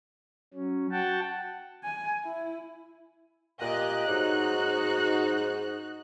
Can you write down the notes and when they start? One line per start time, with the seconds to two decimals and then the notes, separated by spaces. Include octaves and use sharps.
0.54 F#3 C#4
0.92 F#4 F#5 G5 A5
1.84 G#5
2.24 E4
3.62 A#2 G4 D#5 F#6
4.08 G#2 F#3 D#4 F#4